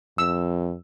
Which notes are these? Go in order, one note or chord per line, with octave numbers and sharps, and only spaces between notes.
F2 E6